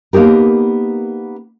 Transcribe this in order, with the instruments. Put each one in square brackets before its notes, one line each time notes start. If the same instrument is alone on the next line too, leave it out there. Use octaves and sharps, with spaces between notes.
[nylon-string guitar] A#3 B3 D#4 G4 A#4